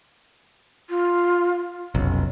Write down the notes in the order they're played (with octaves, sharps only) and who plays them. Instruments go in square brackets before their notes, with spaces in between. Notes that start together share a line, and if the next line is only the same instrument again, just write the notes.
[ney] F4
[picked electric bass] F1 B1 [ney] C#4